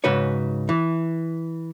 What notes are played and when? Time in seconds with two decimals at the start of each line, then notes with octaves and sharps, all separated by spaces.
0.04 G#2 C#3 F#4 B4 C#5
0.69 E3